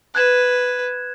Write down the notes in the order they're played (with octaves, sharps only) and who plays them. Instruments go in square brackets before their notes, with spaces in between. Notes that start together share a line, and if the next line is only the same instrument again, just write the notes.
[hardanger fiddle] B4 [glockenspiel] F#6 G#6 E7